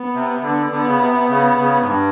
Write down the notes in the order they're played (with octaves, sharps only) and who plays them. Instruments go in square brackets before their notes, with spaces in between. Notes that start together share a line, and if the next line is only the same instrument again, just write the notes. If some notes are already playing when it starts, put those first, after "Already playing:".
Already playing: [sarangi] B3
[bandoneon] C3
D3
[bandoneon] D3 [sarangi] B3
[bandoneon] C#3
C3
C3
C#3
C#3
G#2
G2